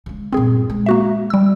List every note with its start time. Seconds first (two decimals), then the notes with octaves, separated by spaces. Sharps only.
0.06 C#3 G#3
0.33 G2 A#2 C4 G#4
0.70 G#3
0.86 A#3 F#4 E5
1.30 G3 E6